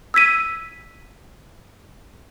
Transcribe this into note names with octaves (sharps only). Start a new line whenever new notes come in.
E6 G#6 B6 D#7